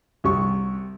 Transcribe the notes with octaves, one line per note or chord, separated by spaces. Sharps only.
C2 G4 C#6